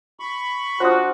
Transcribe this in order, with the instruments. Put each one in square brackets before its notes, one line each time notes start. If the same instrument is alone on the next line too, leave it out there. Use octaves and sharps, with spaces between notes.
[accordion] B5 C#6
[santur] D4 F4 [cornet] F#4 [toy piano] C5 D#6